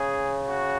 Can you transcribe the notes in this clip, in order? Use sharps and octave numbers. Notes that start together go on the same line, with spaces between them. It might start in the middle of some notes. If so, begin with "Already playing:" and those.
Already playing: C#3 G#4
F#4